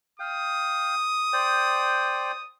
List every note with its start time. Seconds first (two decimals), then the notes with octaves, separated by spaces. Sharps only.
0.20 F5 G5 D#6
1.33 C5 D5 G5